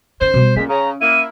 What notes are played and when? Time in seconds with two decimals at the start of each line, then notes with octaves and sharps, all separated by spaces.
0.21 D#3 C#4 C5
0.34 B2 G3
0.56 A#2 G#3 C#4 B6
0.69 C#3 A#5
1.01 A#3 E4 D#7